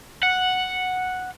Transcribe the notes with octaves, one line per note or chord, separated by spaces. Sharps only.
F#5